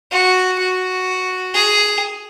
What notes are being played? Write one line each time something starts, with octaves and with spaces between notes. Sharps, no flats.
F#4
F#4
G#4